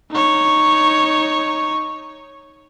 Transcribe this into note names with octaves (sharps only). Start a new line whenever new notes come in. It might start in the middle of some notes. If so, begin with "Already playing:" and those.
D#4 C#5